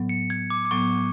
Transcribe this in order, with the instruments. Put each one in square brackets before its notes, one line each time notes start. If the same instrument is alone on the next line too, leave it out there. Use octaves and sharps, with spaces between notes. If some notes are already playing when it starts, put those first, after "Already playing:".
Already playing: [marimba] A2 F#3 B3
[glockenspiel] C#7
G#6
D6
D6
[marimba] A2 F#3 B3 [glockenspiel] C#6